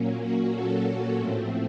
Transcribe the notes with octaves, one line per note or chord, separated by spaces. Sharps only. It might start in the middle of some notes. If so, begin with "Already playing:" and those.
Already playing: A#2 F#3 A#3 C#4
F#4
A4
A4
A2 F3 A3 C4